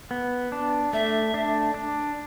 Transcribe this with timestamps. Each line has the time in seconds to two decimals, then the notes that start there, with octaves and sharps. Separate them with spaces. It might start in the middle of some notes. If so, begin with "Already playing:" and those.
0.11 B3
0.52 D4
0.93 A3 E5
1.34 D4
1.74 D4